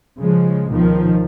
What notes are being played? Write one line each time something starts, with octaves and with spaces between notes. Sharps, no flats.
C#3 F3 G#3
C#2 B2 D#3 F3